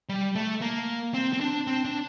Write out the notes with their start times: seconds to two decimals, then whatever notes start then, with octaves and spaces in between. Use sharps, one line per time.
0.09 G3
0.35 A3
0.62 A#3
1.14 C4
1.33 C4
1.41 D4
1.67 C4
1.85 D4